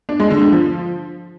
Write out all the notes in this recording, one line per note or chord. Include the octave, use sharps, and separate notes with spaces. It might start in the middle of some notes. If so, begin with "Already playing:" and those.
D4
G#3
D3
D3
F3